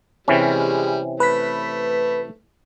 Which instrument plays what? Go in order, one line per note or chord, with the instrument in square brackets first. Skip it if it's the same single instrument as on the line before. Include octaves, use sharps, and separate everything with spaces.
[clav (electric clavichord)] C3 E3 C#4 [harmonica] G3 G#3
[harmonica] A3 [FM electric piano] B4 B6